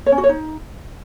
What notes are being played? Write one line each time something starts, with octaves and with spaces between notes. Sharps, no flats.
C#5
C#4
F#4
C#5
D#4